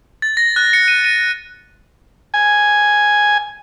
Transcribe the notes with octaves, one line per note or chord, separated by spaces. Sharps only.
A6
A#6
F#6
C#7
D#7
D#7
G#5